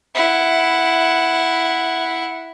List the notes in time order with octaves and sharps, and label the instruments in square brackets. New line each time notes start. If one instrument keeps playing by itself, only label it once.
[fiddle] E4 F#5